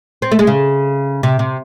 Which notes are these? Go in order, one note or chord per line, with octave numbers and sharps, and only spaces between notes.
C4
A3
G#3
C#3
C3
C3